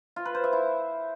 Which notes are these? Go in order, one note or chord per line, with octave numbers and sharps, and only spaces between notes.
F4
B4
C5
E5
E4